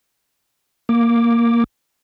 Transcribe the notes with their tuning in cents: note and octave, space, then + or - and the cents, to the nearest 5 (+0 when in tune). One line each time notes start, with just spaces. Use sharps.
A#3 +0 D6 +0